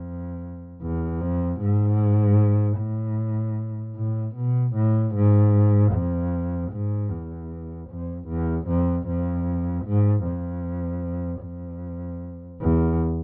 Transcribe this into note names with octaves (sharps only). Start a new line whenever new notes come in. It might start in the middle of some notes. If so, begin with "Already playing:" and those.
Already playing: F2
E2
F2
G#2
A2
A2
B2
A2
G#2
F2
G#2
E2
F2
E2
F2
F2
G#2
F2
F2
E2